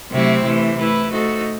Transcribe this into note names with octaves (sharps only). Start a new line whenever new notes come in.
C3 F#3 A3 C4 E4
C3 E3 A3
E3 A3 E4 B4
A3 D#4 F#4 A4 C5